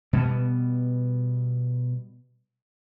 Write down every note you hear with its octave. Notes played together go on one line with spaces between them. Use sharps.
B2 G3 A3 B3